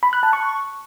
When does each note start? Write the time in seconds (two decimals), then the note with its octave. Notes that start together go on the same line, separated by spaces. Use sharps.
0.03 B5
0.13 F#6
0.23 A5
0.33 C#6